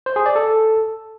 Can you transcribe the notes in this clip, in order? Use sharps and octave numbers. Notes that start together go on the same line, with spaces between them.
C5
G#4
D5
A4